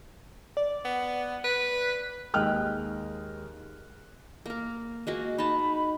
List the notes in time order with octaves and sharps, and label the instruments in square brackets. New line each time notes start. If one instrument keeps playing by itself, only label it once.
[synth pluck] D5
[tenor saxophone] B3
B4
[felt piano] D#2 G#3 D#5 G5 F6 F#6
[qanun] A#3 A#4
G#3 A#3 F#4
[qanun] D#4 A5 [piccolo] B5